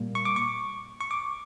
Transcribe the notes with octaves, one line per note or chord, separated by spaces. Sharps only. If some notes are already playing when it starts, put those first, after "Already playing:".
Already playing: A#2 G3 A#3
C#6
D6
C#6
C#6
D6